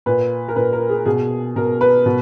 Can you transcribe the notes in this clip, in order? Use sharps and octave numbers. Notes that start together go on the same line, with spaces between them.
A#2 B4
A#4
A#2 B4
A#4
G#4
B2 G#4
B2 A#4
B4
B2